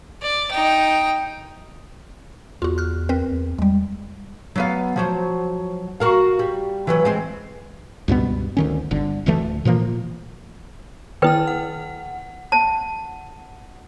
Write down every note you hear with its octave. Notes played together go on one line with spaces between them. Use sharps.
D5
D#4 G5
E2 F4 F#4
F6 F#6
C4 A#4 B4
E2
E2 G3 G#3
F#3 B3 F5
F3 F#3 C5
F#4 A#4 F5
G3
E3 F#3 B4
G#3 C4
C#2 G2 B2 B3
D2 D#3 C#4
G1 D3
D1 D2 E3 A3
A#2 E3 F3 A#3
D#3 E4 B4 G5 F6
F#5
A5